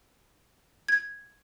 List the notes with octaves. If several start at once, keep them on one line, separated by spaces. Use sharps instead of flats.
G#6